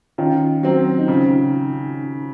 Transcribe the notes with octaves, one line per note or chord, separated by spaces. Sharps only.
D#3 C#4 F4
F#3 C4
D#4
C#3 C#4 F4